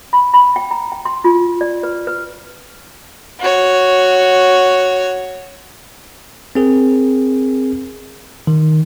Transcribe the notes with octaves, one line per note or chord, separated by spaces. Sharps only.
B5
B5
G5
A#5
G5
C6
F4
D5
B4
B4
F#4 C#5
C4 G#4 A#4
D#3